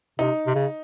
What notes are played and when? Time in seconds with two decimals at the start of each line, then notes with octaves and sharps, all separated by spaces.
0.19 C3 D#4
0.47 C3
0.55 C#3